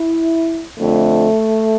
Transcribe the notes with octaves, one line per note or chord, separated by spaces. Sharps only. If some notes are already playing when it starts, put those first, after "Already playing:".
Already playing: E4
F2 D3 F3 A3